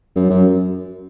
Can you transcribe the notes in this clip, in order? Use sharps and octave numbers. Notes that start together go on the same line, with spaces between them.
F#2
F#2